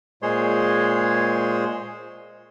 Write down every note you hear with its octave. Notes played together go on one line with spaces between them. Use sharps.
A#2 G#3 G#4 C5 C#5 C6